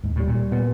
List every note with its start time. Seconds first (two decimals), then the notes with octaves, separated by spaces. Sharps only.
0.04 D#2 G#2
0.16 A2 G3
0.28 A#2
0.35 G3
0.52 A#2 B3